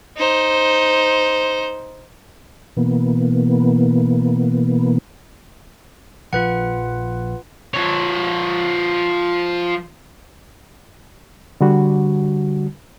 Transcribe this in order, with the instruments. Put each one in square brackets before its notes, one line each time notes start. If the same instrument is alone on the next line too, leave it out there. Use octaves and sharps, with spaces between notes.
[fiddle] D#4 C5
[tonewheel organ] B2 E3 A#3 B3
[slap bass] A#1 F3 [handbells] F4 B4 F#5
[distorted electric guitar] F3 C#5
[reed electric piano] D3 G3 F#4